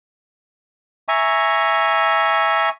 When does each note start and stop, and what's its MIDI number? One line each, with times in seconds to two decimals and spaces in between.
1.08 2.69 76
1.08 2.69 80
1.08 2.69 82
1.08 2.69 85